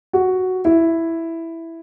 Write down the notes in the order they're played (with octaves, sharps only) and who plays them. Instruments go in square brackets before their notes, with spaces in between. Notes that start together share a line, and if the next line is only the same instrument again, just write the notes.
[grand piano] F#4
E4